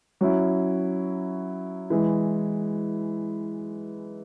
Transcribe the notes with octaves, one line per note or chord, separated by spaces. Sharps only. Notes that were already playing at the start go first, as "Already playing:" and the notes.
F#3 C#4 E4
E3 G#3 E4